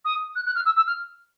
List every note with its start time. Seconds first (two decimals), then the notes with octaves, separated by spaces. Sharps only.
0.05 D#6
0.36 F#6
0.46 F#6
0.56 F6
0.65 E6
0.76 E6
0.87 F6